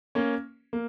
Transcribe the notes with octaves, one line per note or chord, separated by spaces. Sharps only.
A#3 C#4
A#3